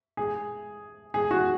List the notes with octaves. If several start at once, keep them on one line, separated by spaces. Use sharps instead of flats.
G#4
G#4
F#4